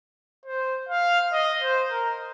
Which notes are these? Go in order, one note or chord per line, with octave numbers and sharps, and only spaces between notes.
C5
F5
D#5
C5
A#4